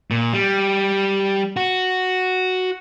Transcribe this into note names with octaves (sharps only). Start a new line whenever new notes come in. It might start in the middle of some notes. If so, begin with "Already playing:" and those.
A#2
G3
F#4